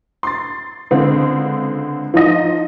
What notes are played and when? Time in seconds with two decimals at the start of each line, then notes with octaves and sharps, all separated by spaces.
0.23 C6 A6
0.91 C#2 D3 C4
2.14 F3 D#4 D#5